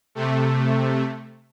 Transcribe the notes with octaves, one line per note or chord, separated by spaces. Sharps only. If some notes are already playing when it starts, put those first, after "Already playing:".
C3 A3